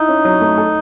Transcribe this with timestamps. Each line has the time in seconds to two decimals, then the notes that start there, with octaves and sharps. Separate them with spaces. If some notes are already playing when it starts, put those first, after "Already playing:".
Already playing: D#4 E4
0.08 C#4
0.25 F#3
0.41 A3
0.58 A4